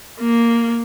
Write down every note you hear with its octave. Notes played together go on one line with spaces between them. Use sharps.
A#3